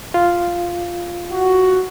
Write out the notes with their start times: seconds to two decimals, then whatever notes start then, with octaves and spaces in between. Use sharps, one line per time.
0.14 F4
1.32 F#4